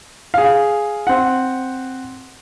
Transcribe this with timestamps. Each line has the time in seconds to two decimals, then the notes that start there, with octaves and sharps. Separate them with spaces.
0.34 G#4 F5
1.07 C4 F#5